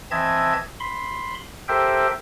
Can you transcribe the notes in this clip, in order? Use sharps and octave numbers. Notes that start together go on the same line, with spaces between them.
E3 C4 D#5 E5 A5 G#6
B5 C6
G4 A4 A#4 C5 E5 G5